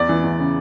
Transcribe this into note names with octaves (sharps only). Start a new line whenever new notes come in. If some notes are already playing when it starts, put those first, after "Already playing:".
Already playing: E2 D5
E3
E2
C#3